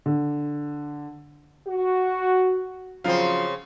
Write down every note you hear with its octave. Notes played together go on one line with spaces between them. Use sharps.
D3
F#4
C#3 F3 F#3 C4 F5